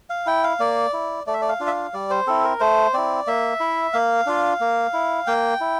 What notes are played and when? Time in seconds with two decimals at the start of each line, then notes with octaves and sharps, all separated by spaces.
0.10 F5
0.27 E4 G5
0.44 F5
0.60 A#3 D5
0.93 E4
1.27 A3 D5
1.34 E5
1.42 D5
1.49 F5
1.60 D4 F4
1.67 E5
1.71 F5
1.93 G3 D5
2.10 C5
2.27 C4 E4 A4
2.44 A#4
2.60 A3 C5
2.94 C4 E4 D5
3.27 A#3 E5
3.60 E4
3.93 A#3 F5
4.26 D4 F4
4.60 A#3
4.93 E4
5.27 A#3 G5
5.61 E4